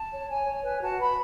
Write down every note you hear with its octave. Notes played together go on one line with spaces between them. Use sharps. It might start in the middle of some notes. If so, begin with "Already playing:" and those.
Already playing: A5
C#5
C#5 G#5
C#5
B4 G#5
F#4 A5
B4 B5